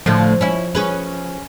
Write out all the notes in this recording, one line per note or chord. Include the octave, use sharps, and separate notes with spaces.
A2 D3 F3 A3
C#4 E4
C#4 G#4 B4